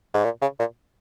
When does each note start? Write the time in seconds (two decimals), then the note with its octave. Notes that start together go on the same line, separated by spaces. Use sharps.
0.14 G#2
0.24 A#2
0.41 C#3
0.59 A#2